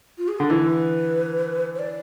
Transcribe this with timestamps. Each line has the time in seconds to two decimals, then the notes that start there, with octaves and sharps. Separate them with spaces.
0.18 F4
0.28 G#4
0.39 D3 A4
0.49 E3 B4
1.75 C5
1.79 D5